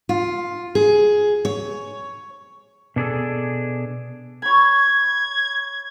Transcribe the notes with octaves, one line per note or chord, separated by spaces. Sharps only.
F4
G#4
C#5
B2 D4 G#4 A4
C#5 B5 G#6